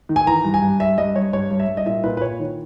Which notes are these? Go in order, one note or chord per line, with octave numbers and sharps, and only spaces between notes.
D#3
G#5
E3 A#5
G2
G#5
G2
G2 E5
G2 D#5
G2 C#5
G2 C#5
G2
E5
G2
D#5
A#2 E5
A#2 B4
B4
A#2 C#5
D#3